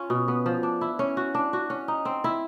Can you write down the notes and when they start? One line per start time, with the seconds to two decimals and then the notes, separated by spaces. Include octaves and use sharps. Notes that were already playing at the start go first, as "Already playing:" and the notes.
Already playing: C#4 F4
0.10 B2
0.28 B3
0.46 F3
0.63 D4
0.81 E4
0.99 C#4
1.17 F#4
1.35 D4
1.53 F#4
1.70 C#4
1.88 D#4
2.05 C4
2.24 E4